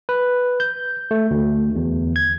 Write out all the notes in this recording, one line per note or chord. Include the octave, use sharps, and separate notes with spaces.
B4
G6
A3
D2
E2
G#6